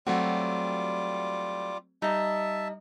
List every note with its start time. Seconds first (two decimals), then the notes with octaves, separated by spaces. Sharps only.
0.07 F#3 G3 A3 C4 F4 F#4 D6
2.02 G3 D#4 D#5 E5 A5